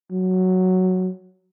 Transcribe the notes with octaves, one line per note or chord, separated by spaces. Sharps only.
F#3